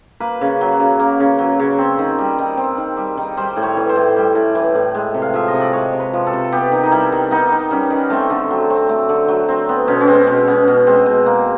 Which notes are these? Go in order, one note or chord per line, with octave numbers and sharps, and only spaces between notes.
A#3 B4
C#3
F#3
C#3
A#3
C#3
F#3
C#3
C4
D#3
G3
D#3
C4
D#3
G3
D#3
G3 C5
A2
C#5
E3
C5
A2
G3
A2
E3
A2
G#3
C3
F5
F3 E5
D#5
C3
D5
G#3 C#5
C3
B4
F3
A4
C3
B3 G4
D#3
D#4
G3 E4
D#3
B3 D#4
D#3
G3 C#4
D#3
A3 C4
D3
F#3
C4
A3
D3
F#3
C4
B3
B2 C#4
C#4
G#3 C4
B2 C#4
B3 C#4
B2
G#3 C4
B2
A#3